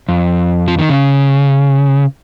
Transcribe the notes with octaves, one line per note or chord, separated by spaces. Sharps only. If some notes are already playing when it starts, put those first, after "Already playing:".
F2
F3
D#3
C#3